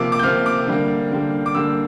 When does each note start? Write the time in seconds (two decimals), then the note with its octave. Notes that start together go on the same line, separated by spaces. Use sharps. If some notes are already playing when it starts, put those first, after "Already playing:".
Already playing: C3 F3 A#3 D6 E6
0.12 D6
0.19 G6
0.23 C3 F3 A#3 F6
0.46 D6
0.67 D3 G3 A#3
1.12 D3 G3 A#3
1.46 D6
1.55 D3 G3 A#3 E6